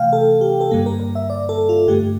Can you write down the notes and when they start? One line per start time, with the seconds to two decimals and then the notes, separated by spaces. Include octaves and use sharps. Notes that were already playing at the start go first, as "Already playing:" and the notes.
Already playing: C3 E3 A3 F5 G5
0.13 A4
0.41 G4
0.61 A4
0.71 G2 D3 G3 A#3 G4
0.86 A#4
1.00 A#4
1.15 E5
1.30 D5
1.49 A4
1.69 F4
1.88 G2 D3 A3 G4